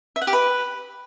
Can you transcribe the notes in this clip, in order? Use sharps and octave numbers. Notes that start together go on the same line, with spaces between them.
E5
F#5
G4
B4